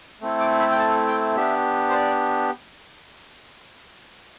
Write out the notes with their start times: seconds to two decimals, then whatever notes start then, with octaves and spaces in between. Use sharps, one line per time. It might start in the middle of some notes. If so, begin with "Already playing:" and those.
0.21 A3 C4 E4 A4
0.40 D6
0.60 B5
0.71 G5
0.79 A5
1.08 G5
1.36 B3 D4 G4 E5
1.89 C5
1.94 D5